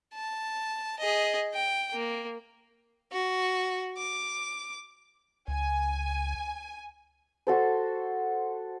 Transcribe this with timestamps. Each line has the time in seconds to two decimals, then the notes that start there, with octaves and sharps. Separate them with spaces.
0.14 A5
0.99 G#4 D#5
1.54 G5
1.94 A#3
3.12 F#4
3.97 D6
5.48 C#2 G#5
7.47 F#4 A4 C5